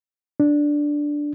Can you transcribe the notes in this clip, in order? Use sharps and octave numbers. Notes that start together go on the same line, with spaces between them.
D4